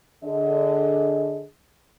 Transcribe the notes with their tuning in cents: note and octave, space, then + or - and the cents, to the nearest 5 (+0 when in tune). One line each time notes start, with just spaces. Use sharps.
D3 +0 G#4 +0 D#5 +30